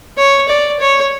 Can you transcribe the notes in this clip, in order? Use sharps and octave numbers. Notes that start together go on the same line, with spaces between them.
C#5
D5
C#5